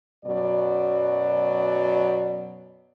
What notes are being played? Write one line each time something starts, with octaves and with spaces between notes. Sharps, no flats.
F#2 B2 F#3 D5